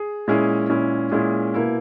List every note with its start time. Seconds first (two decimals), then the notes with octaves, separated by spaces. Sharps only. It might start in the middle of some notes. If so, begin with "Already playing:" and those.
Already playing: G#4
0.27 A#2 G#3 C#4 E4 G#4
0.70 A#2 G#3 C#4 E4 G#4
1.11 A#2 G#3 C#4 E4 G#4
1.54 B2 A#3 E4